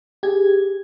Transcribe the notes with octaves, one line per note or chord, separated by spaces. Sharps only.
G4 G#4 G#6